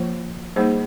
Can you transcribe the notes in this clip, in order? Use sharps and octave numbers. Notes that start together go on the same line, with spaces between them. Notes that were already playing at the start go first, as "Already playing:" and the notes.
Already playing: F3 A#3 F4 C5
G3 A#3 D#4 G#4 C5